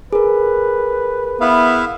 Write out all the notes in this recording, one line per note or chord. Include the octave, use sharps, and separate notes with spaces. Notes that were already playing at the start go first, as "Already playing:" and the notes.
G#4 A#4 B4
B3 E4 E5 F5